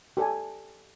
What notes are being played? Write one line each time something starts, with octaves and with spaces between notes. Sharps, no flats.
G4 A4 D5 G#5